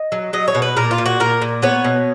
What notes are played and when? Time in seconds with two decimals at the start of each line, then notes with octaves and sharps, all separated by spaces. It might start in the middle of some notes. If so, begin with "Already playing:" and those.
Already playing: D#5
0.12 F#3
0.33 F#3 D#5
0.48 C#5
0.55 B2
0.62 B4
0.76 A#2 A#4
0.91 F4
0.98 A#2
1.06 F#4
1.20 A#2 A#4
1.42 A#2
1.62 B3 C#5
1.84 B2